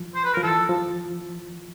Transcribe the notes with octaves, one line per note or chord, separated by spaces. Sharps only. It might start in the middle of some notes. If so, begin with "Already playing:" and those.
Already playing: F3
C5
B4
F3 A#4
E3 A4
F3